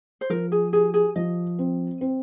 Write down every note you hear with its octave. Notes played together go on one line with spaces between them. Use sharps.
C5
F3 A#4
G#4
G4 G#4
G#4
F3 D#5
C4
C4